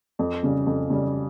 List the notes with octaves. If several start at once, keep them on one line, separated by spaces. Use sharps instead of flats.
F2
C#3 G3
F2
C#3 G3